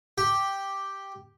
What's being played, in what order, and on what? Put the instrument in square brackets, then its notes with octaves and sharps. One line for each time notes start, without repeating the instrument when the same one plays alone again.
[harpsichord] G4